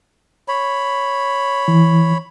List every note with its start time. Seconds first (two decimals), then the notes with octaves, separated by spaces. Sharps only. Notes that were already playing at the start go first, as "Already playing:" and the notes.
0.48 C#5 B5
1.68 E3